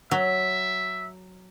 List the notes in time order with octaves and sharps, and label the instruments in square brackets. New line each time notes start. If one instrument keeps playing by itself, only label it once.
[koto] F#3 [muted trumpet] E5